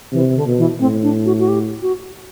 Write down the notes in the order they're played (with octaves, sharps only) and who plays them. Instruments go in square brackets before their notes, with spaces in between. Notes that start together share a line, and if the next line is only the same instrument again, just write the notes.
[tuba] C3 [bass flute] E3
[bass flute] D3
[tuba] B2
[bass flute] E3
[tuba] A2 [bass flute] C4
[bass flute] D4
F#4
F#4
G4
F#4